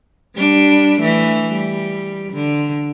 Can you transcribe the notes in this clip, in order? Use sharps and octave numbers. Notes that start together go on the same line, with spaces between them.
G3 D4
E3 A3
G3
D3